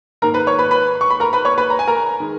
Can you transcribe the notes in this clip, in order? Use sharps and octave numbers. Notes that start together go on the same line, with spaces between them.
G#2 D#3 A#3 A#4 A#5
B4 B5
C#5 C#6
B4 B5
B4 B5
C#6
B5
A#4 A#5
B4 B5
C#5 C#6
B4 B5
A#5
G#5
A#4 A#5
D#3 G#3